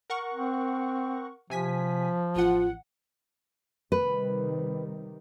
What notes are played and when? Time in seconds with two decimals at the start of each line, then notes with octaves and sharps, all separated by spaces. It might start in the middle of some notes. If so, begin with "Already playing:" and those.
0.10 A#4 F#5 C#6
0.34 C4
1.50 C3 F3 G#5 B6
2.36 A1 F4 F#5
3.92 C3 D#3 G3 B4